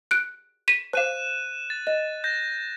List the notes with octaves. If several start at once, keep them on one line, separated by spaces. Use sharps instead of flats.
F#6 D7
B6 D#7 E7
C5 F5 F#6 D#7 E7
A6
D#5
G6 A#6